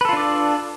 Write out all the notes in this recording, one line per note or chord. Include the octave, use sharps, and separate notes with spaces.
D4 F4 A4 B4 D5